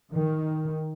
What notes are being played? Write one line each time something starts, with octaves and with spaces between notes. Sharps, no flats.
D#3